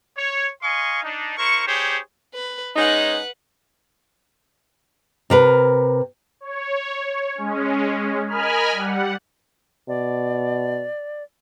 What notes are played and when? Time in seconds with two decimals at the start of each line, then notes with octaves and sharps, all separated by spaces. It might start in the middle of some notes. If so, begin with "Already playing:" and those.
0.17 C#5
0.63 D#5 F5 G#5 C6 C#6
1.03 D4 D#4
1.37 E4 A#4 C5 C#6
1.67 D4 G4 G#4 C5 C#5
2.34 B4
2.76 G#3 C#4 D#4 B4 F#5
5.30 C3 A#4 B4
6.41 C#5
7.35 G#3 C#4
8.27 A#4 D#5 G#5 B5 F6
8.72 G3 F#5
9.88 B2 D5